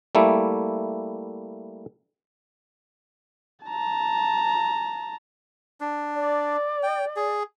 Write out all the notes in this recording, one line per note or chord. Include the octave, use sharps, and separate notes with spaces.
G3 A3 A#3 E4
A5 A#5
D4
D5
G5
G#4